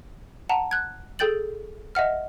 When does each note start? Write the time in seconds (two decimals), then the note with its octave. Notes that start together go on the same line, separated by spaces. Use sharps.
0.49 F#5 A5 A#5
0.71 F#6 G#6
1.19 G#4 A4 G5 G6 A6 F#7
1.95 D#5 E5 F#5 F6